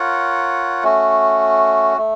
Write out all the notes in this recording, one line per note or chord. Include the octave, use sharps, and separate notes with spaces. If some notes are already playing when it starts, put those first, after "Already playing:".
Already playing: F4 A#4 C#5 F#5
A3 C#4 F#4
A3